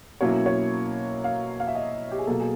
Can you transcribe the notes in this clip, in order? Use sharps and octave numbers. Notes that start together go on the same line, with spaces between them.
B2 F#3 A#3 C#4 E4 C#5
C#5
F5
F5
E5
D#5
G4
G#4
B2 F#3 A#3 A4
G#4